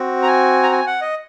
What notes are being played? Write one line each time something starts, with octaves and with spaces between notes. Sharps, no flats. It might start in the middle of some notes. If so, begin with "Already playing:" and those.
Already playing: C4 F#4
A#5
G#5
A#5
G#5
F#5
D#5